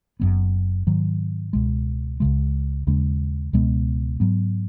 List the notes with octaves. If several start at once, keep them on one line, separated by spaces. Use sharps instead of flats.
F#1 F#2 F#3 B3
G#2 D#3 F#3
C#2 B2 G#3
C#2 C#3 G#3
D#2 C#3 G#3 C#4
C#2 B2 G#3 B3
G#2 F#3 B3